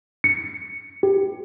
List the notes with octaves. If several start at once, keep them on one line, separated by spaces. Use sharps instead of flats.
C#7
G4